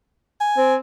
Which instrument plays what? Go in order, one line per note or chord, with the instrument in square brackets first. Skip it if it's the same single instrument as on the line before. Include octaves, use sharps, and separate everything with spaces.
[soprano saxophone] G#5
[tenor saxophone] C4